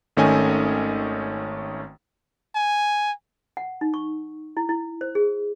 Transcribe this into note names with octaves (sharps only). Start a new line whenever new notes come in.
G#1 D#3 A3 C#4 D#5 G#5
G#5
F#5
D#4
C#6
E4
E4
C5
G#4